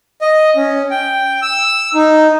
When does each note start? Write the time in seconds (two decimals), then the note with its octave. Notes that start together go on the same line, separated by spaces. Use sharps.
0.21 D#5
0.56 C#4
0.91 G5
1.42 E6
1.94 D#4